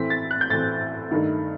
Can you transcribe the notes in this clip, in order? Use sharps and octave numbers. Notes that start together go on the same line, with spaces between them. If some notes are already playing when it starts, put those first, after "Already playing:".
Already playing: A2 E3 A3 C4 B6
A6
F#6
G6
A2 E3 A3 C4 A6
G2 D#3 A3 D#4